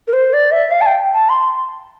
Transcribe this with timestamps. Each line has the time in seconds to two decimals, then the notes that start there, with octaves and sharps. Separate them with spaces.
0.07 A#4
0.13 C5
0.33 D5
0.52 E5
0.71 F5
0.81 A5
0.86 G5
1.14 A5
1.29 C6